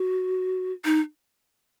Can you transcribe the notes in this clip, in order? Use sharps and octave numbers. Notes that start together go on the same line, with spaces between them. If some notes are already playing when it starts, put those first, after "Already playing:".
Already playing: F#4
D#4